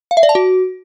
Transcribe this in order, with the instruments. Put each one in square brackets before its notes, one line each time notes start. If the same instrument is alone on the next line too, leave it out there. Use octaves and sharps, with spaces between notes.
[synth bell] F5
E5
D5
A5
F#4